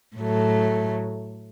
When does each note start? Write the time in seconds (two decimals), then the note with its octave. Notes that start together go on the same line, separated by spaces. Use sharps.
0.17 A2 F#3 A3